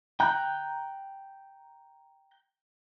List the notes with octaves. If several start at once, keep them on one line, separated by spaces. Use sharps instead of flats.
G5 A#5 F#6 G6